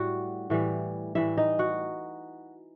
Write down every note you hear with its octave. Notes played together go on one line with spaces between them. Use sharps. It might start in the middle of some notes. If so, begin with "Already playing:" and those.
Already playing: A2 G3 F#4 F#5
A2 E3 G3
A2 E3 G3 E4 E5
D#4 D#5
F#4 F#5